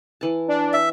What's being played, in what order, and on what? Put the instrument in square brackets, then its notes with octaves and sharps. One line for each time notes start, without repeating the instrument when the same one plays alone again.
[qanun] E3 A5
[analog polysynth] D4
[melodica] E5